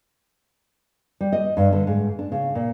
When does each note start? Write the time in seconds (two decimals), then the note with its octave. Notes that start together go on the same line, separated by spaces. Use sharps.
1.21 G3
1.32 D#5
1.57 G2
1.72 D3
1.87 G#2
2.19 D4
2.32 C#3
2.55 A#2